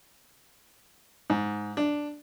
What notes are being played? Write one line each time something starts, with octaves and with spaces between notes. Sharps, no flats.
G#2
D4